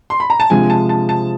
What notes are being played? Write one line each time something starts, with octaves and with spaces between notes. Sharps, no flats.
C6
B5
A#5
A5
C3 F3 G#3 G#5
A5
A5
A5